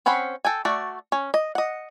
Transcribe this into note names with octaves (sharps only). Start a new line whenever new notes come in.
C4 C#4 C5 F#5 B5
A4 G5 G#5
A3 F#4 D5
C#4
D#5
D#5 F#5